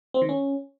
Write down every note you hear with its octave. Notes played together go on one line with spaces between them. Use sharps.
C4
D#3
C#4